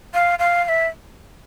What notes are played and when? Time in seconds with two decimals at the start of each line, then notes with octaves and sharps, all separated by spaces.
0.14 F5
0.39 F5
0.65 F5
0.69 E5